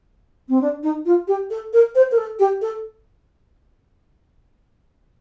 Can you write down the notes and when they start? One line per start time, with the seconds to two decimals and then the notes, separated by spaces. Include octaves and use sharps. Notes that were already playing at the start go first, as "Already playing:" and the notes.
0.49 C4
0.61 D4
0.83 D#4
1.05 F4
1.28 G4
1.50 A4
1.73 A#4
1.95 C5
2.12 A#4
2.18 A4
2.39 G4
2.62 A4